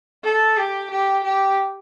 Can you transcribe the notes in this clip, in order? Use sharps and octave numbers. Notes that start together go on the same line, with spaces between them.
A4
G4
G4
G4